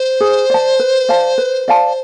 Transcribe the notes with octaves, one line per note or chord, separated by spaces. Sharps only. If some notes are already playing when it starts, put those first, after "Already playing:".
Already playing: C5
G#4
D5 A5
B4
D5 F5 A5
B4
D5 F5 A5